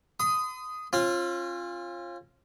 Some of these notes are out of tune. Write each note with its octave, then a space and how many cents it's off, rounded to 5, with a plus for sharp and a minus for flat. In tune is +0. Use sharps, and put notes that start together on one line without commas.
C6 -45 D#6 +0
C#4 -45 F4 +0